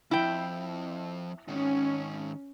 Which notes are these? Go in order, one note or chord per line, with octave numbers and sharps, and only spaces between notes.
F2 G#2 E4 G5
G#2 D#3 C#4